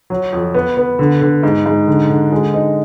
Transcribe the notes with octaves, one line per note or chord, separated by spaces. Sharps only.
F#3
F2
B3
B3
D3
D3
G#2
G#2
D3
D3
G#3
D#4